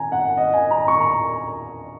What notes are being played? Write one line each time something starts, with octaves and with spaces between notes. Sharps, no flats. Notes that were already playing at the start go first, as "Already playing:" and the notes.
Already playing: G#5 A#5
F#5
D#5
G#5
A#5
C#6
A#5